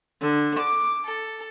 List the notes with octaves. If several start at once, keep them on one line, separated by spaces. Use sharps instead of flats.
D3
D6
A4